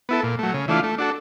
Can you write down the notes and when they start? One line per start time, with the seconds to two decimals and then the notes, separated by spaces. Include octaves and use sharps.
0.09 B3 E4 A4
0.24 A#2
0.39 F#3 A3
0.54 C#3
0.68 E3 A3 D4 F4
0.83 A3
0.98 D4 F#4 A4